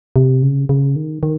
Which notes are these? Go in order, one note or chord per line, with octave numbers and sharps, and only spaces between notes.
C3
C#3
C#3
D#3
D#3